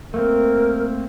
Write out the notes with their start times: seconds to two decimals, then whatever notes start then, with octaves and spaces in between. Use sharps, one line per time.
0.14 A3 A#3 C4 A#4